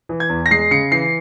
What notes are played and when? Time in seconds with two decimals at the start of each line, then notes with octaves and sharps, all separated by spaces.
0.09 E3
0.20 G#6
0.29 E2
0.46 A#6
0.51 G#3 C7
0.71 C#3 C#7
0.92 E3 C7